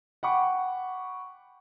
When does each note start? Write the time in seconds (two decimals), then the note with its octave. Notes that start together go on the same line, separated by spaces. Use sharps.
0.23 F#5 G5 B5 C#6 D6